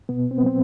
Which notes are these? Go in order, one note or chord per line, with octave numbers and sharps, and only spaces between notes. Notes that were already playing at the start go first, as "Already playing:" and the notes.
B2 B3
C4
B3
F#3 C4